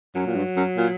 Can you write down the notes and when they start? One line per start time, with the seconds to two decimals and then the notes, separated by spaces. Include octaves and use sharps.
0.15 F#2 F#3
0.26 A#2
0.36 G2
0.57 F#2
0.77 A#2